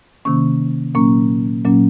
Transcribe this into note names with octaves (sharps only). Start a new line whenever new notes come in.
C3 D#3 A#3 C#4 C#6
A#2 F#3 A#3 C#4 C#6
A#2 F#3 A#3 C#4